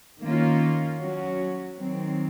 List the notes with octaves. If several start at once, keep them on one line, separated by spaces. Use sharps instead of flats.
D#3 A#3 C#4 F4
F#3 C#4 F#4
D#3 F#3 C4